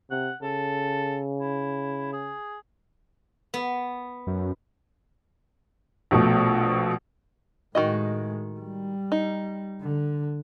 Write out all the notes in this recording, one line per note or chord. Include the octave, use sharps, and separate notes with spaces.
C3 F#5
C#3 A4
E4
G#4
B3
F#2
A#1 B2 A3
A2 D#3 G#3 F#4 D#5
G3
D#4
D3